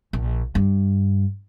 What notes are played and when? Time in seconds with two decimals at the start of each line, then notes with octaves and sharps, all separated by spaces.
0.13 A#1
0.55 G2